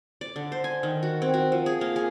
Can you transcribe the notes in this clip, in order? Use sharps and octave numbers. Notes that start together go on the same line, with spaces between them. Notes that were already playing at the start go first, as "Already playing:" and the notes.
D5
D3
C5
G#5
D#3
F#4
C4
F#4
F3
G#4
A#3
G#4